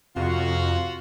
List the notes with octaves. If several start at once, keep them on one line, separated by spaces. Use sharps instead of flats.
F2 C3 F4 F#4